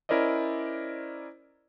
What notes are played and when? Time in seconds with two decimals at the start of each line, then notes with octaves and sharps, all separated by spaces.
0.09 C#4 E4 A#4 C5 D5 D#5